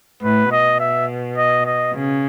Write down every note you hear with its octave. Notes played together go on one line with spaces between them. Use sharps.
A2 B4
B2 D#5
E5
D#5
D#5
C#3